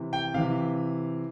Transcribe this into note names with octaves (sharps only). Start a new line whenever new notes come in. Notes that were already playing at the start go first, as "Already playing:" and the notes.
Already playing: C3 E3
G5
C3 E3 F5